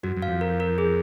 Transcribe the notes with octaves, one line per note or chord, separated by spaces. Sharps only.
F#2 F#4
F#2
F5
F2
A#4
A#4
G#4